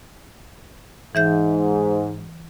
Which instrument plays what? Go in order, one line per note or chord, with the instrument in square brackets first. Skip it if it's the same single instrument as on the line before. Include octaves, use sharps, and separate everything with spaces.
[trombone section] G#2 [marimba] E3 E5 G6